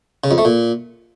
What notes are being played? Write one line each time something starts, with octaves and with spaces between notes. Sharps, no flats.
C#3
F2
A3
A#2